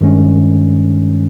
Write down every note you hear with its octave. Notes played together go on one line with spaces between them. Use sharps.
G2 D#3 G#3 C#4